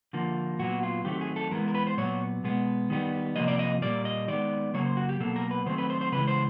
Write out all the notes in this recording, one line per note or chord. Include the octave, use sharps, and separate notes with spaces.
D3 F3 A#3
A#2 F#3 B3 F#4
F4
D#3 F#3 A3 C4 G4
G#4
A4
E3 G#3 B3 A#4
A#4
B4
C5
A#2 F#3 B3 C#5
B2 G#3 B3
D#3 G3 B3
C3 F3 A#3 D#5
D5
D#5
A#2 G3 A#3 D5
D#5
D#3 G#3 B3 D5
C#3 F#3 A#3 C#5
C5
F#4
G4
B2 F#3 A#3 A4
A#4
B4
D#3 F#3 A3 C4 C5
B4
C5
C5
C#3 E3 G#3 B4
C5